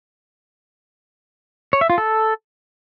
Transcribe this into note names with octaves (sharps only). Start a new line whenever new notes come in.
C#5
E5
F4
A4